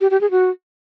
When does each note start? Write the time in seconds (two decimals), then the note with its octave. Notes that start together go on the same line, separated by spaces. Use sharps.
0.01 G4
0.11 G4
0.21 G#4
0.31 F#4